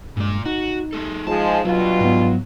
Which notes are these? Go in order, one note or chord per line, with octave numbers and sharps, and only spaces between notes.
G2 A#2 G#3 D5
D#4 F#4
G#3 A4
F3 G#3 A5
G2 B2 F#3 F4
G#2 B3